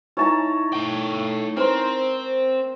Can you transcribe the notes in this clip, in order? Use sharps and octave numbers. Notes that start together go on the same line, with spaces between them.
D#4 E4 C#5 A5 A#5
A3 G5
C4 A#4 C5